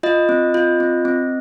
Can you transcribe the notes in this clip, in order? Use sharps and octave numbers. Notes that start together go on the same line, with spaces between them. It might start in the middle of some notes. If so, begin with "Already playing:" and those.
F4 D#5
C4
F4
C4
C4